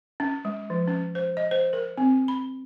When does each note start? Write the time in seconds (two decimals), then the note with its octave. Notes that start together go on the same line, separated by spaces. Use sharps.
0.20 C#4
0.45 G#3
0.70 F3
0.88 C#4
1.15 C5
1.37 D#5
1.51 C5
1.73 A#4
1.98 C4
2.28 B5